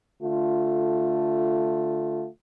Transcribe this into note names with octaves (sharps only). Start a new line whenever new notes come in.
D3 A3 F4